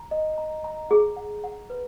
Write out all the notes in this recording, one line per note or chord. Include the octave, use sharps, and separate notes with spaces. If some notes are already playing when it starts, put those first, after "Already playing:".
Already playing: A#5
D#5
A#5
A#5
G#4 F#5
F#5
F#5
B4